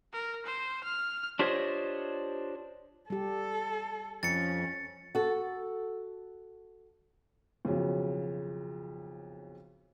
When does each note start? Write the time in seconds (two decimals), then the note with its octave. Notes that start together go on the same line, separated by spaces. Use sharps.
0.13 A#4
0.46 C5
0.84 F6
1.39 D4 F4 G4 C5 C#5 D#5
3.10 G3 G4 A4
4.23 F2 C#4 A6 C#7
5.15 F#4 A4
7.65 B1 F2 C#3 F#3